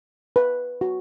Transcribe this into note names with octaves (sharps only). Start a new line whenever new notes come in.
B4
F#4